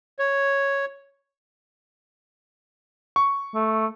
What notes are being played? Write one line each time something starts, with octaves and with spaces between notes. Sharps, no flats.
C#5
C#6
A3